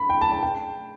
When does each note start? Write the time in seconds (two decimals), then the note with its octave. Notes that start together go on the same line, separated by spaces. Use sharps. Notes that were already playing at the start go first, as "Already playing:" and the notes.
Already playing: B5
0.09 G5
0.21 A5
0.32 A5
0.43 G5